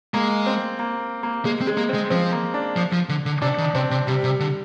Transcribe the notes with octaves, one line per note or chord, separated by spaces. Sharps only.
G#3 A#3
C4
A#3
A#3
G#3 A#3
C4
G#3
A#3
C4
G#3
F3 C4
A#3
D4
F3
F3
D3
D3
C3 D4
D#3
C3 C4
C3
C3 G3
C3
D3